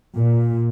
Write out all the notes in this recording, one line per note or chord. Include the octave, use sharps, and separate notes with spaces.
A#2